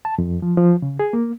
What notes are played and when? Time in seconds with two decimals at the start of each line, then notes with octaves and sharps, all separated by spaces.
0.05 A5
0.18 F2
0.42 F3
0.57 F3
0.82 C#3
0.99 G#4
1.13 A#3